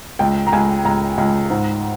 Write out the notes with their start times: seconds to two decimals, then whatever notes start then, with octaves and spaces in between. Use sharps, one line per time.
0.19 C#2 G5
0.47 A#5
0.52 C#2 G#5
0.85 C#2 A#5
1.18 C#2
1.50 G#2